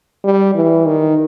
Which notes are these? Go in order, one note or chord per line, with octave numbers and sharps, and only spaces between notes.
G3
E3
D#3